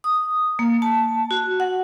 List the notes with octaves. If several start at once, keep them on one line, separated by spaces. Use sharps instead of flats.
D#6
A#3
A5
F#4
F#5